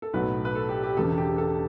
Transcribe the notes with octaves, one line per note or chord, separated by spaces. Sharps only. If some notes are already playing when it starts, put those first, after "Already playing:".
A4
B1 A2 F#3 B3 B4
B4
A4
G4
G4
E1 E2 C#3 A4
G4
A4